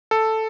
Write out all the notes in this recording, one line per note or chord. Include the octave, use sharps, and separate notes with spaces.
A4